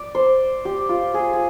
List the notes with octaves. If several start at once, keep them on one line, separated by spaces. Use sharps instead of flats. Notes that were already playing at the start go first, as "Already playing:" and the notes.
Already playing: D5
C5
G4
F4
G#4
G#4